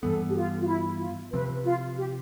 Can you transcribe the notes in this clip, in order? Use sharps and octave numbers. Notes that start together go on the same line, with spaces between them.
G2 E3 G3 B3 A4
G4
F4
F4
E4
F4
C3 F3 C4 B4
F4
G4